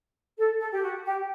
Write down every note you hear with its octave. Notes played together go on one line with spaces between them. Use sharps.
A4
A4
G4
F#4
G4